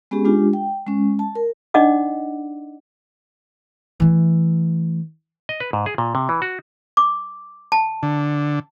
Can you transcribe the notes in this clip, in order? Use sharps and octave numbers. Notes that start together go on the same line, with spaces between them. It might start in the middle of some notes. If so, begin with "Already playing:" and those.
G#3 B3 C#4 G4 G#4
G#3 D4 F4 G4
G5
G#3 C#4
A5
A#4
D4 D#4 D5 D#5 F#5 D6
E3 A3
D#5
B4
G#2
G#4
A#2
C3
E3
F#4
D6
A5
D3